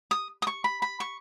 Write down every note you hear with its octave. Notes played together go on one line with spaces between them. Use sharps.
D#6
D#6
C#6
B5
B5
C#6